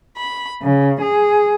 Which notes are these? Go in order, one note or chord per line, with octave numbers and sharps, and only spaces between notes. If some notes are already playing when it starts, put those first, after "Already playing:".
B5
C#3
G#4